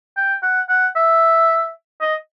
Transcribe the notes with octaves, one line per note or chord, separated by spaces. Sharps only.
G5
F#5
F#5
E5
D#5